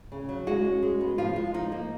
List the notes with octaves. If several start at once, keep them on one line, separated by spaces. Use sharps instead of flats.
C#3
F#3
G#3 F#4
C#4
G#3
B3
F3 F4
G#3
F3 D#4
A#3